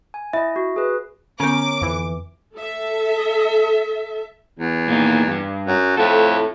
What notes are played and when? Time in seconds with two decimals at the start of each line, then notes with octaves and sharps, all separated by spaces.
0.14 G#5
0.33 E4 D#5 E5
0.56 F#4
0.76 G#4 B4
1.40 D3 B3 C#4 A#4 D6
1.81 F2 E3
2.55 A4 E5
4.59 E2
4.88 A#2 A#3 D#4
5.27 G2 G3
5.67 F#2
5.97 F2 E4 A4